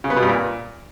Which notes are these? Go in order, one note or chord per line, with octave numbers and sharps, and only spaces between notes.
C#3
B3
B2
G2
A#2